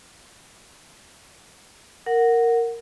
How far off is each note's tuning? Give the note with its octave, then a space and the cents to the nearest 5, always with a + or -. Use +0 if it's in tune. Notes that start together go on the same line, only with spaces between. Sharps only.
A#4 -10 F#5 -5